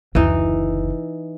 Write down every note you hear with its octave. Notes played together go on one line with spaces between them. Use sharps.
F#1 D2 E3 D#4